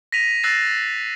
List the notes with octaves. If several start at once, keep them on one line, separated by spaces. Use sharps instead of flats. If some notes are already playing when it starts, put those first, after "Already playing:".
A#6 B6 D#7 F7
E6 F#6 A6 A#6 C7 E7